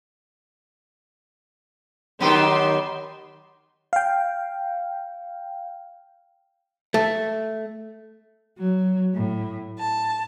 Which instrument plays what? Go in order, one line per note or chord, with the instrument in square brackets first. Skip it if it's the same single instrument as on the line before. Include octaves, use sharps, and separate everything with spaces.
[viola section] D#3 C6 [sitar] F#3 B3 G4
[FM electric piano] F5 G5
[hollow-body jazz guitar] A3
[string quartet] F#3
A2
A5